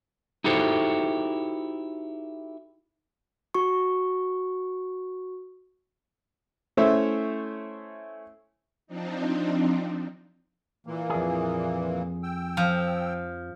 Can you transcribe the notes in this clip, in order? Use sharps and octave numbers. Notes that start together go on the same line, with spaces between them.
D#4 E4 F#4 G4 A4 C5
F#4 C#6
A3 C#4 E4 C5 C#5 E5
F3 C4 D4 D#4
A#2 E3 A#3
F2 G#4
G5 E6
F3